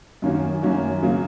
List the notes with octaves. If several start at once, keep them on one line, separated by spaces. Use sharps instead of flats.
F#2 D#3 A#3 C#4 F#4
F#2 D#3 A#3 C#4 F#4
C#3 F#3 A#3